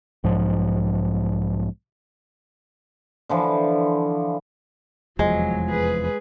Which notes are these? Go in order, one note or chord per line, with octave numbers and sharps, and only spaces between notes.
B1 G#2 F3
D3 E3 F3
F1 E2 F3 F#3 G#3
G#4 B4